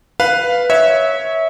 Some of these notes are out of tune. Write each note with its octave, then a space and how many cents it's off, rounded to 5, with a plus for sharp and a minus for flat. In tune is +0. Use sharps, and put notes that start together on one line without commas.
B4 +0 F5 +0
C#5 +0 E5 -25